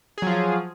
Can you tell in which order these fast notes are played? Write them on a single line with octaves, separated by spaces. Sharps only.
G#4 F#3 F3 F4